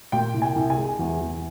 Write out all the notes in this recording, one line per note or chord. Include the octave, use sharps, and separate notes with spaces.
A#2 G5
C2
G#5
C2
G#5
G#3
E2
E2